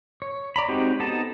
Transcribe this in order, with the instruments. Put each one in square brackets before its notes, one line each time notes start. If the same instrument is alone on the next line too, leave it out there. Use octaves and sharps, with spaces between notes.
[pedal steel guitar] C#5
D5 A#5 B5
G#3 C4 D#4 F#4 G4
B3 D#4 A4 A5